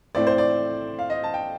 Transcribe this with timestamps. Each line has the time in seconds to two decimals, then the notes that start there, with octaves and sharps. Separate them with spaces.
0.15 A2 A3 C4 D5
0.27 C5
0.38 D5
0.99 F5
1.10 D#5
1.24 A5
1.34 G5